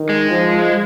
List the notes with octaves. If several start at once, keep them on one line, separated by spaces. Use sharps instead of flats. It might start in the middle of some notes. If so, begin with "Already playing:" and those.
Already playing: D#3
G#3
F3